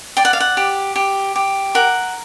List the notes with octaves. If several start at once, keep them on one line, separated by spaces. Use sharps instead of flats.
D5 G5
F#5
F5
F#5
G4
G4
G4
A#4 F#5